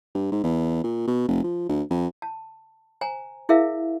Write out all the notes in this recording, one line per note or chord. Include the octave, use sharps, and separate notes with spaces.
G2
G#2
E2
A#2
B2
F1
F3
D2
F2
A5
C5 G#5 A#5
E4 G#4 A#4 E5 F5